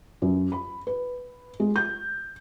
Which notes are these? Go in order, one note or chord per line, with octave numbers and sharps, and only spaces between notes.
F#2
B5
B4
G#3
G6